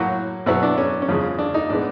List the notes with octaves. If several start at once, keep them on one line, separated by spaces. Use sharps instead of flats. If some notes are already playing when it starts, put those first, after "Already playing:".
Already playing: A2 F#3 A#3 F#4
B2 F#3 B3 E4
D4
C#4
C#4
E2 C#3 F3 G#3
D4
D#4
A2 E3 G#3 B3 D4